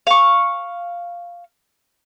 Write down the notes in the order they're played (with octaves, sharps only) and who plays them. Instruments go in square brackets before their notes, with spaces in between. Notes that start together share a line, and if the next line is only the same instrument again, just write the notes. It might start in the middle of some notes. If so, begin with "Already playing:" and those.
[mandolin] F5 C#6